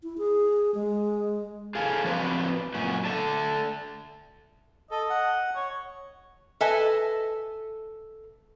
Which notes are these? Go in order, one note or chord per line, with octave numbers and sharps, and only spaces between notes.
E4
G#4
G#3
G#4 A4 F5
F3 C4 F#4 B4 C5 D5
F#2 A#2 C#4 F#4
A3 A4 D5 A5
A4 D#5
F#5
C#5
A4 B4 D#5 E5 G#5 A5